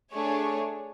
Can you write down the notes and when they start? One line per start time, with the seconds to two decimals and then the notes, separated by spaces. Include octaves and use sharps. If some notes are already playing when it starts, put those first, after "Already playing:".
0.11 A3 D4 G#4 C#5